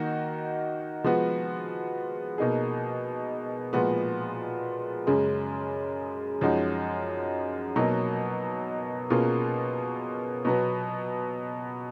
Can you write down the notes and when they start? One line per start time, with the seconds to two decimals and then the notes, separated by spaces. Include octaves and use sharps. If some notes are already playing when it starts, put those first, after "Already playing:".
Already playing: D#3 A#3 D#4 F#4
1.04 F3 G#3 B3 F#4
2.38 B2 A#3 D#4 G#4
3.73 A#2 F3 G#3 B3 F#4
5.07 F#2 C#3 G#3
6.41 F#2 F3 G#3 D#4 F#4
7.76 B2 F#3 A#3 D#4
9.10 B2 A#3 C#4 F4 G#4
10.45 B2 F#3 B3